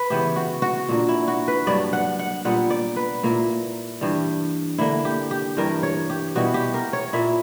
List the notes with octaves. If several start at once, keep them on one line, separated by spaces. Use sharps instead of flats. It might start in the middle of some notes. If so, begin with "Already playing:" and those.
Already playing: B4
C#3 E3 B3 E4 G4
F#4
F#4
A#2 A#3 D4
E4
F#4
B4
G2 F#3 A#3 D4 D5
F#5
F#5
A#2 G3 B3 F#5
D5
B4
A#2 A#3 E4
G2 E3 G3
D3 A#3 D4 E4
G4
G4
G2 E3 G3 A#4
C#5
G4
B2 G3 B3 E4 F#4
G4
A#4
C#5
A#2 A#3 E4 E5